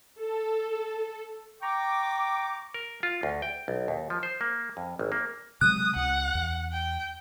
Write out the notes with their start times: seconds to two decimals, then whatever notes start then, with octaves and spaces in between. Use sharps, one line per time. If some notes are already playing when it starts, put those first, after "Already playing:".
0.20 A4
1.61 G5 A#5 C#6 D6
2.74 A#4
3.03 F4
3.23 D2
3.42 G5
3.68 B1
3.88 D#2
4.10 F3
4.23 C5
4.41 A#3
4.77 F2
4.99 G#1
5.12 A#3
5.61 C3 F#3 G#3 D#6 F#6
5.96 C#2 F#5
6.35 E2
6.72 G5